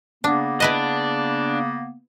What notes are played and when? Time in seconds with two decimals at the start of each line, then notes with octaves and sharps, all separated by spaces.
0.24 C#3 A#3 B3 D4
0.60 D4 E4 B4 D#5